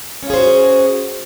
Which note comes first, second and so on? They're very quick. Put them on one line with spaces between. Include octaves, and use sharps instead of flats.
C#4 F4 G#4 C5 F#4